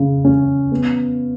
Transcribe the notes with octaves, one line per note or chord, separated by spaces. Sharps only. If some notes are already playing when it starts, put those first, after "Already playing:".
Already playing: C#3
C#4
B3